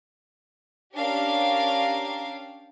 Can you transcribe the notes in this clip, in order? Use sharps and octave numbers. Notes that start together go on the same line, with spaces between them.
C#4 D4 G4 A#4 F5 G5